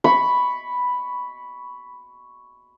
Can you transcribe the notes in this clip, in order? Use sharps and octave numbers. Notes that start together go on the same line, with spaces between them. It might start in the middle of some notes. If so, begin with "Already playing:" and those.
B5 C#6